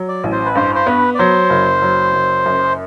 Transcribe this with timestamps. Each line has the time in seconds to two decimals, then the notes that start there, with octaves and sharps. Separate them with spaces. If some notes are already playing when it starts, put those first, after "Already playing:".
Already playing: F#3
0.08 D5
0.24 A1
0.32 C5
0.45 B4
0.55 G2 C5
0.75 C5
0.87 B3 B4
1.15 D5
1.18 F#3 C5
1.50 F#1
1.82 F#3
2.13 F#1
2.46 F#2